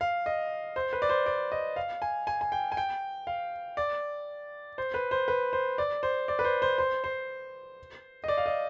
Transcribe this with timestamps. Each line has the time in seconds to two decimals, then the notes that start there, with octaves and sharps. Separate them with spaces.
0.01 F5
0.26 D#5
0.76 C5
0.93 B4
1.02 D5
1.09 C5
1.26 D5
1.52 D#5
1.76 F5
2.02 G#5
2.27 G#5
2.41 G#5
2.52 G5
2.72 G#5
2.77 G5
3.27 F5
3.77 D5
4.78 C5
4.94 B4
5.11 C5
5.28 B4
5.53 C5
5.78 D5
6.03 C5
6.28 D5
6.39 B4
6.45 C5
6.62 C5
6.78 C5
7.04 C5
8.24 D#5
8.28 D5
8.38 F5
8.46 D#5